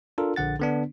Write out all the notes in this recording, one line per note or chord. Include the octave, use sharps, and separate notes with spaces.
D4 F4 A4 A#4
A#1 D3 F#5 A6
D3 B3 D4